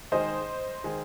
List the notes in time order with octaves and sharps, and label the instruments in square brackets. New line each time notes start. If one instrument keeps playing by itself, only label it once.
[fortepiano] D#3 G#3 D#4 G#4 [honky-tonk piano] C5 D#5
[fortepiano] D#3 G#3 D#4 G#4